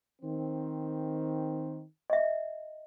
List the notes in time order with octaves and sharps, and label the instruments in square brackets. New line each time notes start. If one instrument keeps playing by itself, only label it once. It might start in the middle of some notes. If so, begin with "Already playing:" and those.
[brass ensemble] D#3 C4
[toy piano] D#5 E5